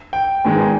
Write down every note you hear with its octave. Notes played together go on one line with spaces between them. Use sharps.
G5
G#1 G#2 D#3 G#3 B3 G#5